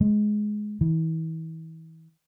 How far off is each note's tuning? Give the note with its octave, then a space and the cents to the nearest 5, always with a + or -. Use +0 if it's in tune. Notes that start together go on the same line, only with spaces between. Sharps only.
G#3 +15
E3 -35